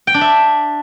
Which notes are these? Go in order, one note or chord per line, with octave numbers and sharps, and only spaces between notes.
G5
D4
E5